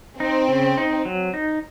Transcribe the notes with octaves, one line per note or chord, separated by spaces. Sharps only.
C4 D#4
C#3
D#4
F#3
D#4